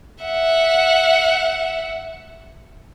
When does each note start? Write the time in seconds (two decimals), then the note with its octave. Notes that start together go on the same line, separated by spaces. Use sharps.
0.24 E5 F#5